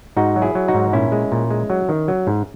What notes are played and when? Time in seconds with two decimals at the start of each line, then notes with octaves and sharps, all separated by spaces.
0.16 G#2 D#4 F#4
0.36 F#3
0.42 E4 G#4
0.55 F#3
0.68 D#4 F#4
0.74 G#2
0.93 A#2 C#4 E4
1.12 G#3
1.32 A#2
1.51 G#3
1.70 F#3
1.89 D#3
2.08 F#3
2.27 G#2